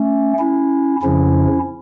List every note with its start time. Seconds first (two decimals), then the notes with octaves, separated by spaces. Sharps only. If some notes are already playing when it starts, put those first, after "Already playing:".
Already playing: A3 C#4
0.39 C#4 E4
1.02 F2 C#3 F3 C#4 E4